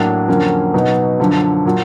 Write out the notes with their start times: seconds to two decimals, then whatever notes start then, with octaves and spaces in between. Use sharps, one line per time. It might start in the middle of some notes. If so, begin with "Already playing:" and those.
Already playing: A2 F#3 A#3 D4
0.28 F2 D3 F#3 A#3 C#4
0.74 B2 F#3 B3 D#4
1.19 F#2 D3 F3
1.65 A#2 F#3